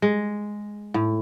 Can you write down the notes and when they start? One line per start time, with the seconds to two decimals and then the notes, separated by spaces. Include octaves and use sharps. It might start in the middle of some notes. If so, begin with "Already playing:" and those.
0.02 G#3
0.94 A2